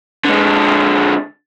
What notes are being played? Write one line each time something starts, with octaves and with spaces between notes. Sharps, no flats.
D3 G#3